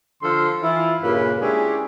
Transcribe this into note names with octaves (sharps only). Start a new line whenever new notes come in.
D3 F3 A4 F5 C6
E3 E4 F4
G2 A#2 C#3 A#3 B4
G#3 C#4 D4 E4 G4 G#4